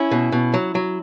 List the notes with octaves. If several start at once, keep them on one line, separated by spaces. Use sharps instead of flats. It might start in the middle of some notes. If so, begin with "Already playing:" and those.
Already playing: C#4 E4
B2
B2
F#3
F#3